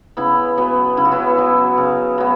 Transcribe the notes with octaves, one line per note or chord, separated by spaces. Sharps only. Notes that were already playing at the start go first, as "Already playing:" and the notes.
C#3 B3 E4
F#3 B3
C#3 E4
F#4
B3 E4
F#3 B3
C#3
F#3 B3